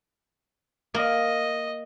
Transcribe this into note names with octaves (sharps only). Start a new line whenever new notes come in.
A#3 D#5